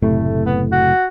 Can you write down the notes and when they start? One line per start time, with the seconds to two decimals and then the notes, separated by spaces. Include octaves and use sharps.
0.02 F#1 A2 C3 A3
0.46 B3
0.72 F#4